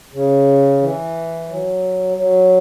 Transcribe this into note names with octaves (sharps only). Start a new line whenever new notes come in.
C#3
E3
F#3
F#3